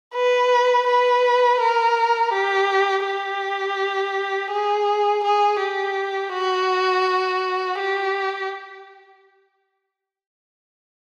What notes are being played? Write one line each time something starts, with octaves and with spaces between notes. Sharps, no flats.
B4
B4
A#4
G4
G4
G#4
G#4
G4
F#4
G4